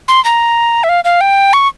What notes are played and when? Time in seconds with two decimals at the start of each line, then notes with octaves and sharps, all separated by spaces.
0.08 C6
0.25 A#5
0.84 E5
0.89 F5
1.05 F5
1.21 G5
1.53 C#6